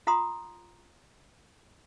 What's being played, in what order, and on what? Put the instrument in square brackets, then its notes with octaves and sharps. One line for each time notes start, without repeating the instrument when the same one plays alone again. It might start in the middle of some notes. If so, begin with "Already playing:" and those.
[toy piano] F4 F#5 A#5 C6 D#6